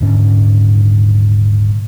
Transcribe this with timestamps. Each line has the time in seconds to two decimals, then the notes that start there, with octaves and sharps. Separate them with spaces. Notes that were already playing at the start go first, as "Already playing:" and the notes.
0.01 D#1 G#2 D3 C#4